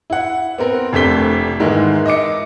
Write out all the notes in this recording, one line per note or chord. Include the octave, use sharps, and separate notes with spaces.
E4 F#5
B3 C4 A#4
F1 F2 A3 D4 B6 G7
G#2 D#3 E3 G#3 A#3 E4
D#5 E5 D6 C#7